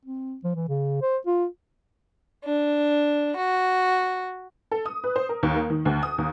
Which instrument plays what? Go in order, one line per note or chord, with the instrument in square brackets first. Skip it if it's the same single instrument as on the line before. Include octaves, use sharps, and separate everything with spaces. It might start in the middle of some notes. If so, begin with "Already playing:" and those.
[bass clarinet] C4
F3
E3
C#3
C5
F4
[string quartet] D4
F#4
[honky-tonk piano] A4
D#6
B4
C5
A#4
D#2
A#3
D#3
D2
D#6
D#2